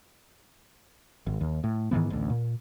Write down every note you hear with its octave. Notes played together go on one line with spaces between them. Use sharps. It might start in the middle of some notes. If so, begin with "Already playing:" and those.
G#1
D#2
A2
G#2 D#3 E3 B3
A1 D2
A#2